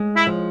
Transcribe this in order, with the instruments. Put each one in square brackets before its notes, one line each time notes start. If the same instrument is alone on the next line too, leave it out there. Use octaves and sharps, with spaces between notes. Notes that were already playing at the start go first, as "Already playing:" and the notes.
Already playing: [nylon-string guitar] G#3
[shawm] E4
[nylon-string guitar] F3